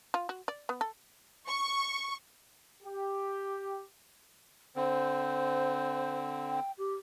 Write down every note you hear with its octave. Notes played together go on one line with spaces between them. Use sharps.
F4
F#4
D5
B3
A4
C#6
G4
D3 C4 C5
G5
G4